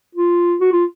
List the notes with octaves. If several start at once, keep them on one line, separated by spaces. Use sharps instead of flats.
F4
F#4
F4